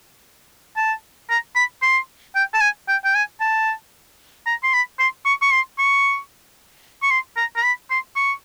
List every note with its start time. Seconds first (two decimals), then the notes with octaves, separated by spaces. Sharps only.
0.76 A5
1.30 A#5
1.56 B5
1.82 C6
2.35 G5
2.54 A5
2.61 G#5
2.88 G5
3.04 G5
3.15 G#5
3.40 A5
4.46 A#5
4.63 C6
4.73 B5
4.99 C6
5.25 C#6
5.41 C#6
5.52 C6
5.78 C#6
7.03 C#6
7.11 C6
7.37 A#5
7.56 A#5
7.64 B5
7.91 C6
8.16 C#6